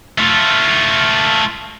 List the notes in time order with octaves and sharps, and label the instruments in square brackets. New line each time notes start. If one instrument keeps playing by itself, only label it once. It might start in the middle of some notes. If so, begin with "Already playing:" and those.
[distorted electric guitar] A3 F4